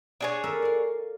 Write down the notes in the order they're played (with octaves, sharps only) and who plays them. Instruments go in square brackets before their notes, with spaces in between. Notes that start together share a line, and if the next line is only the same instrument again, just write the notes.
[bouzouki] D4 G#4 C#5
[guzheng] A4 A#4 E5
D5 F5